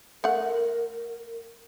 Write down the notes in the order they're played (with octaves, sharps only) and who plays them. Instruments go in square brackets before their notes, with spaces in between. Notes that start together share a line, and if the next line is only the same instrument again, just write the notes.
[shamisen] A3 F#5 [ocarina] A#4